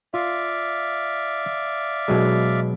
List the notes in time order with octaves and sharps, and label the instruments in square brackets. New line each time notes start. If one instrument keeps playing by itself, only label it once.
[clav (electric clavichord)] F4 [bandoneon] D5 E5 F5
[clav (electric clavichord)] B2 F#3 G#3